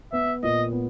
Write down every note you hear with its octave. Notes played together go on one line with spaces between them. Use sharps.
B3 E5
A#2 D#5
B3